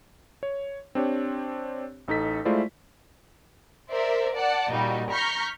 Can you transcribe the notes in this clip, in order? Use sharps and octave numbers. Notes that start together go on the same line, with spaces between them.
C#5
C4 D4 G4 C#5
A1 D#4 A4 B6
G#3 A3 E4 F4 C5 D5
A#4 C5 D5 E5
D5 F#5 A5
A#2 G3 D#4 F#4
A#5 C#6 F6 G6 A#6 B6